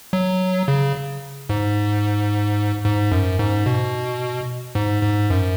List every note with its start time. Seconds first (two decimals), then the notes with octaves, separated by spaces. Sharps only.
0.13 F#3
0.68 C#3
1.49 G#2
2.85 G#2
3.12 F#2
3.39 G#2
3.66 B2
4.75 G#2
5.03 G#2
5.30 F#2